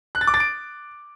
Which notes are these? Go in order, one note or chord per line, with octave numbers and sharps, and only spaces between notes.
F#6
A6
D6
A6
D7